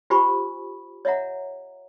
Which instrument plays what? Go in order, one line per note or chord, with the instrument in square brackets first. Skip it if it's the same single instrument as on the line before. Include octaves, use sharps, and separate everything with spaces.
[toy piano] F4 G4 C5 G#5 B5 C#6
C#5 D#5 E5 F#5 A#5